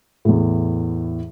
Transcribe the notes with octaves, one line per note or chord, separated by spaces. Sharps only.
E2 A2